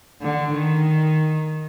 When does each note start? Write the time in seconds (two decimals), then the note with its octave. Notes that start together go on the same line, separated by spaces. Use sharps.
0.21 D3
0.53 D#3